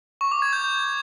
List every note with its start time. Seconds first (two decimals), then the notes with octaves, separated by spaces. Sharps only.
0.21 C#6
0.31 D6
0.42 G#6
0.53 G6